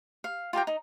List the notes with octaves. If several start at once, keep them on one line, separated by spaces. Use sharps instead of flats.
F5
F4 G4 A#4 G5
D#4